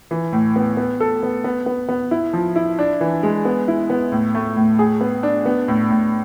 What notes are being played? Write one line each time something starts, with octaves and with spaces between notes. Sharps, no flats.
E3
A2
B3
B3
A4
B3
B3
B3
B3
E4
F3
E4
D4
E3
G#3
B3
E4
B3
A2
A3
A2
G#4
B3
D4
B3
A2
A2